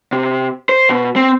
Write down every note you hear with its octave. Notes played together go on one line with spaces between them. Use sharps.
C3
C5
B2
C4